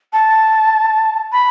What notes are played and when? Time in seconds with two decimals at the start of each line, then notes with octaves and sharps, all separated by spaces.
0.13 A5
1.32 B5